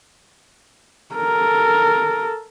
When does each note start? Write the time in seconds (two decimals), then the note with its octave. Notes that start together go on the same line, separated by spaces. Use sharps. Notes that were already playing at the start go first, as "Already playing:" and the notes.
1.15 A4 A#4